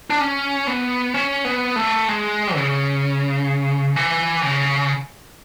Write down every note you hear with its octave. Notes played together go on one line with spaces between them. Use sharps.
D4
C#4
B3
C#4
B3
A3
G#3
C#3
E3
C#3